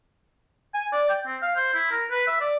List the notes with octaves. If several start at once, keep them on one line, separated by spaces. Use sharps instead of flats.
G#5
D5
G5
C4
F5
C5
E4
A#4
B4
E5
D5